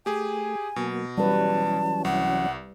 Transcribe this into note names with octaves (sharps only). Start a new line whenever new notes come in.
A3 G4 G#4 G#5
B2 F#3 A#3
E3 F#3 G3 C#4 B4 A5
C2 F#5